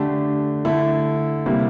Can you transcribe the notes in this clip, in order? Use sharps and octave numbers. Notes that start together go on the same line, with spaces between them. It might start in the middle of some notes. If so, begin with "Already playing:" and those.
Already playing: D3 A3 D4 G4
D3 A3 E4 A4
C3 G3 A#3 E4